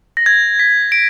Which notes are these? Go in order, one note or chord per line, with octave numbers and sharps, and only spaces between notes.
A#6
G#6
B6
D7